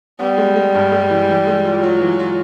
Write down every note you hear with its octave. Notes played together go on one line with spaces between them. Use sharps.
G3 B3
G#3
G#3
G2
G#3
E3
E3
G#3
F4
F#3 F4
E3
F4